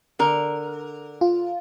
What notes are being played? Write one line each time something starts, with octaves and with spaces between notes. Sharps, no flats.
D3 A#4
F4